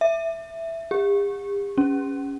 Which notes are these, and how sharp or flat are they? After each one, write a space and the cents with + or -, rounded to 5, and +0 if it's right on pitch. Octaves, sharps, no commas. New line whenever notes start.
E5 +5
G4 +45
C#4 +0